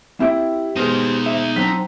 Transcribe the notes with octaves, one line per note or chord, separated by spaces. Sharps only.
C4 E4 G4 G5
B2 G#3 D#4 C5 F5
E5
F#3 C4 D4 A#5 B6